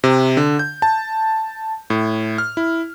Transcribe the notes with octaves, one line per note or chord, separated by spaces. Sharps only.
C3
D3
G6
A5
A2
F6
E4